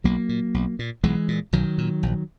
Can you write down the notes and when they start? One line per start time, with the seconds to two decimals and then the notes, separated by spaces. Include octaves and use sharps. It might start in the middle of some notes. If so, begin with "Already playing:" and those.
0.04 B1 F#3 A#3
0.29 A#2
0.54 B1
0.79 A#2
1.04 B1 E3 G#3
1.28 A#2
1.53 B1 D#3 F#3
1.78 A#2
2.03 A#1